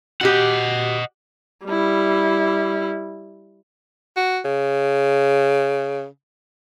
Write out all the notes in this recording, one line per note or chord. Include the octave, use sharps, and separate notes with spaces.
F#4 G4 D#5 F#5
G3 E4
F#4
C#3